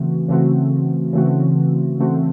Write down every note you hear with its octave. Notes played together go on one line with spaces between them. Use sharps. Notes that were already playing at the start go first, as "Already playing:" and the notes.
Already playing: C#3 E3 A3 C4 F#4
C#3 E3 A3 C4 F#4
C#3 E3 A3 C4 F#4
C#3 E3 A3 C4 F#4